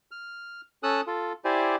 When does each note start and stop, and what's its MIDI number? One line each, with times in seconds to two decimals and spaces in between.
0.11 0.61 89
0.83 1.01 61
0.83 1.01 69
0.83 1.01 87
0.83 1.01 88
0.83 1.01 90
1.07 1.33 65
1.07 1.33 69
1.45 1.76 64
1.45 1.76 67
1.45 1.76 72
1.45 1.76 74
1.45 1.76 80